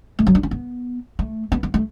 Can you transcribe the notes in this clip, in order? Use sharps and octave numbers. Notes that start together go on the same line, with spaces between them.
A3
F#3
D4
C#4
B3
A3
B3
B3
A3